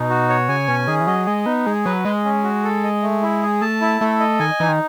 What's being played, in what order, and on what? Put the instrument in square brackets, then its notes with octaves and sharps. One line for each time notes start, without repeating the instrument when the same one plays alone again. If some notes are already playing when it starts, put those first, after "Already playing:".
Already playing: [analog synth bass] B2 [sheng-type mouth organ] D#4
[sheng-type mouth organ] F#4
C#5
[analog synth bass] C#3 [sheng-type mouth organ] G#5
[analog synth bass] B2 [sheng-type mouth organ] C#4
[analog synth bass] D#3 [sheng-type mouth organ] G#4
[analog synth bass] E3
[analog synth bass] F#3 [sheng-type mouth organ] D#5
[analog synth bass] G#3 [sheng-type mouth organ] D#5
[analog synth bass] B3 [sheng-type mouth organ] D#4
[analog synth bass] G#3 [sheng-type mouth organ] G#4
[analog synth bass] F#3 [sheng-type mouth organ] B4
[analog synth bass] G#3 [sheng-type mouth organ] D#5
[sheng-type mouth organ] C#4
F#4
A4
D#5
A3
E4
G#4
[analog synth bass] A3 [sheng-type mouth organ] A5
[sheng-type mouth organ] E4
[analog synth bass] A3 [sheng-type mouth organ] A4
[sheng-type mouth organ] D#5
[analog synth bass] D#3 [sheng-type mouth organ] G#5
[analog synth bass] E3 [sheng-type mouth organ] D#4
[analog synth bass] D#3